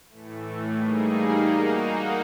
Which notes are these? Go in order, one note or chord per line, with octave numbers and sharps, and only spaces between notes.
A2 E3 A3
G3 A#3 D#4 G#4
A#3 D#4 F#4